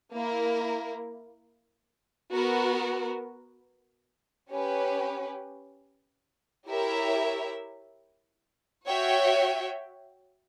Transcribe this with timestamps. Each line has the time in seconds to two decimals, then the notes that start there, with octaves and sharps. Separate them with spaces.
0.13 A#3 E4 A#4
2.32 B3 F#4 A#4
4.50 C#4 G4 B4
6.68 E4 G4 A#4 C#5 E5
8.87 F#4 C#5 E5 G5